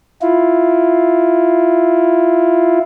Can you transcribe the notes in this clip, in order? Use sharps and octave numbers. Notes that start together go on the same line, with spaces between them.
E4 F4